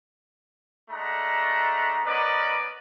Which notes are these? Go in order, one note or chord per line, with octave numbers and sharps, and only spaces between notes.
G#3 A3 D4 F#5 A#5
B3 C#4 A#4 B4 D5 D#5